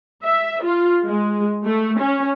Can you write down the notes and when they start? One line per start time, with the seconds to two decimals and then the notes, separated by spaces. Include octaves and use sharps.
0.24 E5
0.64 F4
1.05 G#3
1.66 A3
1.99 C#4